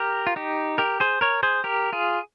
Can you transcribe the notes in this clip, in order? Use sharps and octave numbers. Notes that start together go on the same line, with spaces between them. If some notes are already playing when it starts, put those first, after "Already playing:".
Already playing: G4 A#4
F4
D#4 G4
G4 A#4
G#4 C5
A#4 C#5
G#4 C5
G4 A#4
F4 G#4